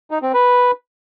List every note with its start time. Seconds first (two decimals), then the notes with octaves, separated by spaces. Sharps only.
0.11 D#4
0.22 C4
0.34 B4